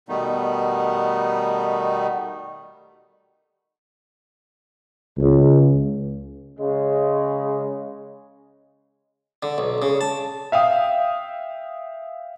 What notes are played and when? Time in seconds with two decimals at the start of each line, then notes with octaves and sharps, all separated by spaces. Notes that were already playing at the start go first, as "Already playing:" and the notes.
0.09 B2 D#3 G3 A3 B3 D#4
5.18 C#2
6.58 C#3 G#3
9.43 D3
9.58 B1
9.82 C#3
10.01 A5
10.52 E5 F5 G5 D#6